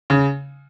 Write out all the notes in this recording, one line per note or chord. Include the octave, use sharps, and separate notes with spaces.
C#3